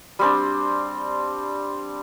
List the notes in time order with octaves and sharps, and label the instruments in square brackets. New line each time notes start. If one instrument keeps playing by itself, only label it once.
[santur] G3 C4 D4